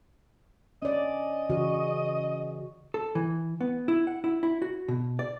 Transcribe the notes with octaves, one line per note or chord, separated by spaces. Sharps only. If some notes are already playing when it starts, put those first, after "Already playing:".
C#4 D5 D#5
C#3 E3 F#4
A4
E3
B3
E4
F#5
E4
E4
F#4
B2
D5